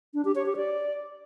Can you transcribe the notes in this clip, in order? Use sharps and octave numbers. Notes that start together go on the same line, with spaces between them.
D4
G4
C#5
G4
D5